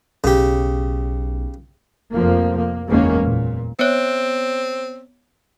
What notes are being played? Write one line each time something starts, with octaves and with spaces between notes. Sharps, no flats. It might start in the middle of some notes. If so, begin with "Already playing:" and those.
B1 C#3 G4
F1 F2 F3 A#3
A#3
F#1 E2 D#3 G#3 A#3 C#4
A#2
B3 C4 C#5